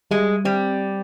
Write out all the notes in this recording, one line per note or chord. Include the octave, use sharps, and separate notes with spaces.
G3 G#3
G3 C4